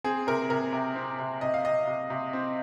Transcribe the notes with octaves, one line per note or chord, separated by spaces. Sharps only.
C4 G#4
C3 A#4
C3 A#4
C3
C4
C3
C3 D#5
F5
C3 D#5
C3
C3
C4